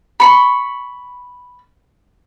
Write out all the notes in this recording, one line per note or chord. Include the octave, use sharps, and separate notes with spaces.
B5 C#6